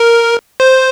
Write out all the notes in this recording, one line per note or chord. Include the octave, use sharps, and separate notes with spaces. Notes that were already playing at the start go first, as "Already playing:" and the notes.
Already playing: A#4
C5